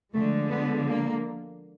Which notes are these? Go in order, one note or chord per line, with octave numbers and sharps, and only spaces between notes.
D3 F3 G#3 A3
B3
A#3